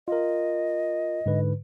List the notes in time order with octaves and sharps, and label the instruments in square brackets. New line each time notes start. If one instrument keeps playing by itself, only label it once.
[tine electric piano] F4 A#4 [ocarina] D#5
[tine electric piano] G#2 D3 B4